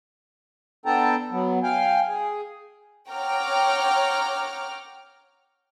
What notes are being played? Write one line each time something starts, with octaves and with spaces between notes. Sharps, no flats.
B3 D4 A4 G5 A5 A#5
F#3 B3
F5 G5 G#5
G#4
C#5 F#5 G5 A#5 D6 F6